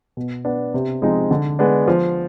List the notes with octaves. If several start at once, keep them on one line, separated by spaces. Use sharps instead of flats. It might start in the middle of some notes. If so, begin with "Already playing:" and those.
B2
B3 D4
C3
F3 G#3 C4 D#4
D3
G#3 B3 D4
F3